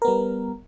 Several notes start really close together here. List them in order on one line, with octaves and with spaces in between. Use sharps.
A#4 B3 G3